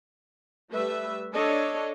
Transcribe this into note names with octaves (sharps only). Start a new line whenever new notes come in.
G3 A3 B4 E5
D4 A4 C#5 D#5